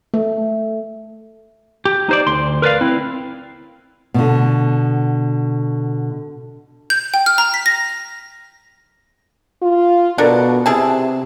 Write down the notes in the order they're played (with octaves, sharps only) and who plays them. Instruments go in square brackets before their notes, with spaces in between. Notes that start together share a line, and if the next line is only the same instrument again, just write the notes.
[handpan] A3
[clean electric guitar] G4
D#4 C5 D5
D2 C6
A#4 B4 D5 F5
C4 E4
[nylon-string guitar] B2 D3
[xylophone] G6
G5
F6
A#5
B6
A#6
[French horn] F4
[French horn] B2 [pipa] D4 A4 A#4
[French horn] C3 [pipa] E4 G#4 A5